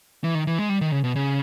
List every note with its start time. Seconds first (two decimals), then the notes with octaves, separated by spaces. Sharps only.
0.24 E3
0.35 D#3
0.47 E3
0.59 G#3
0.69 G3
0.81 D#3
0.92 C#3
1.04 B2
1.16 C#3